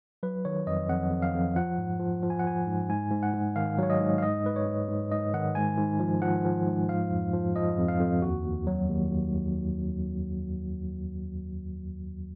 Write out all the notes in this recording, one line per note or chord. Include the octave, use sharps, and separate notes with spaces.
F#3 B4
D#3 C#5
F2 D#5
F2 F#5
F2
F5
F2
F3 F#5
G#2
F3
F3
G#5
F#5
F3 G#5
G#2
G#2 G#5
G#2
F#5
G#2
D#3 F5
F#3 C#5
D#5
G#2
F5
G#2 D#5
G#2 B4
C#5
G#2
G#2
G#2 D#5
D#3 F#5
G#2 G#5
G#2
F3
F3 F#5
F3
G#2
F3 F5
F2
F3
F3 D#5
F2
F5
F2
D#2 F#4
D#2
F#3
D#2
D#2
D#2